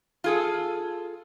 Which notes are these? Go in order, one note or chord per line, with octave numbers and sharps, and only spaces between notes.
F4 G#4 A4